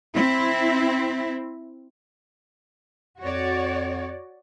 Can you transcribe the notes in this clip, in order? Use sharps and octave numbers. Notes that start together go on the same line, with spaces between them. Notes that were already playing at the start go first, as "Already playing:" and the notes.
C4 E4
F2 F#4 C#5 D5